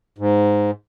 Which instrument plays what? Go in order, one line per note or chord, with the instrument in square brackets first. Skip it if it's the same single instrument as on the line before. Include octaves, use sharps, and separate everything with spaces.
[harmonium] G#2